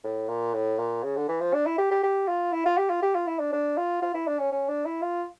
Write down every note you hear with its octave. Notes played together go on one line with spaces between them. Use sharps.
A2
A#2
A2
A#2
C#3
D3
E3
F3
D4
E4
G4
G4
G4
F4
E4
F4
G4
F4
G4
F4
E4
D4
D4
F4
F4
E4
D4
C#4
C#4
D4
E4
F4